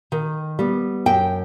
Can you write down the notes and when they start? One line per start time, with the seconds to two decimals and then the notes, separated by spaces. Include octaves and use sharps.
0.12 D#3
0.59 G3 B3
1.06 F#2 G5